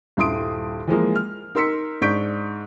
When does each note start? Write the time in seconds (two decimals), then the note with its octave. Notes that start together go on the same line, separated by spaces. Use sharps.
0.17 D#1 G2 E4 C6 D#6 D7
0.87 E3 F3 G#3 A#3
1.15 F6
1.55 D#4 A#4 C6 E6 B6 C#7
2.02 G#2 D4 C#6 G6 B6 D7